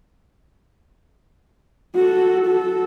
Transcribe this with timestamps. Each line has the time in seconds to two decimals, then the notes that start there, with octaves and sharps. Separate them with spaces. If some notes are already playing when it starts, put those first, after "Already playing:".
1.95 F#4 A4
2.46 F#4 A4